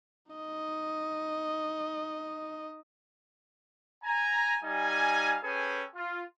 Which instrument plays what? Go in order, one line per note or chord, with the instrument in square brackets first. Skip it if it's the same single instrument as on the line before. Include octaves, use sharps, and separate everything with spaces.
[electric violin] D#4 D#5
[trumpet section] G#5 A#5
G3 D#4 F5 G#5
C#4 G#4 A4 B4 G5 G#5
F4